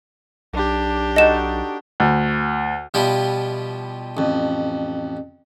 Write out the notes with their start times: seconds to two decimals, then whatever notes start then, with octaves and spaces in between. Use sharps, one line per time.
0.53 B1 D4 G4
1.16 D#4 F#4 A4 D#5 E7
2.00 D2
2.94 B2 F3 G3 E4 F4 G4
4.17 A1 F2